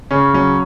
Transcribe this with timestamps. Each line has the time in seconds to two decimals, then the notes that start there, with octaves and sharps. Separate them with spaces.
0.11 C#3 C#4
0.34 F#3 C#4